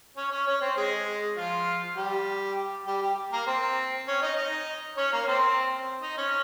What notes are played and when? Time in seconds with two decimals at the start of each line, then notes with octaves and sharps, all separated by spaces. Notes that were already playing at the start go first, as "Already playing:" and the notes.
0.17 C#4 C#5
0.32 C#4 C#5
0.47 C#4 C#5
0.62 C4 C5
0.77 G#3 G#4
1.37 F3 F4
1.97 G3 G4
2.87 G3 G4
3.02 G3 G4
3.32 A#3 A#4
3.47 C4 C5
4.07 C#4 C#5
4.22 D#4 D#5
4.37 D#4 D#5
4.97 C#4 C#5
5.12 A#3 A#4
5.28 C4 C5
6.02 D#4 D#5
6.18 C#4 C#5